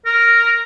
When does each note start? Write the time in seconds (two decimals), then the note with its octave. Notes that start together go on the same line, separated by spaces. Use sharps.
0.05 A#4